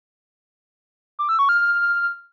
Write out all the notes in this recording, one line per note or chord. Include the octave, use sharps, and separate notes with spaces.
D6
E6
C#6
F6